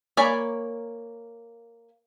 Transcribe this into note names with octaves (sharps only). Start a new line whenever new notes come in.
A#3 C#5 D5 G#5 B5